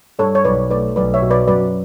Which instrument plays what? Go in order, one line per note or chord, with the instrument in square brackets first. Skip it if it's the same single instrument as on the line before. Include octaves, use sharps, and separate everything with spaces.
[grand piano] G2 [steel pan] A4 C#5
[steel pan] C#5
[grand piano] B1 [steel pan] B4 D5
[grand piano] A3 [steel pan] B4 D5
[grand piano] B1 [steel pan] B4 D5
[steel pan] C#5 E5
[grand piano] B2
[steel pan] B4 D5
[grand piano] F#2 [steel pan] B4 D5